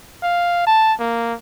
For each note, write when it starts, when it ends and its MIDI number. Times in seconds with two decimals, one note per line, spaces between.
0.23 0.62 77
0.67 0.94 81
0.99 1.34 58